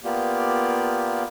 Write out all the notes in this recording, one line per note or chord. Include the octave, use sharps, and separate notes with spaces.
A#3 B3 F4 G4 D5